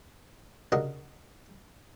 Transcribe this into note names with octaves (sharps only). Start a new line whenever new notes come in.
C#3 D4 F#4 A#4 D#5 C#6